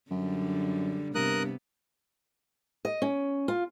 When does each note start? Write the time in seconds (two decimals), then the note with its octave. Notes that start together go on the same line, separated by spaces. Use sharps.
0.11 F#2 D3 G3
1.15 G2 C3 B3 A#4 D#6 F#6
2.85 D#5
3.02 C#4
3.48 F4